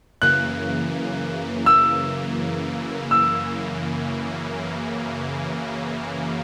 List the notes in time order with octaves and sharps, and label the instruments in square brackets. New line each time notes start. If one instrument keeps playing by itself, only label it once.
[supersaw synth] F#2 C#3 E3 A#3 [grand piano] F#6
[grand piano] E6
E6